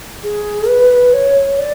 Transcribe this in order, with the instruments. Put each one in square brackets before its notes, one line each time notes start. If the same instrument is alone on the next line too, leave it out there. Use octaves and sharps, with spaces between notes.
[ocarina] G#4
B4
C#5
D5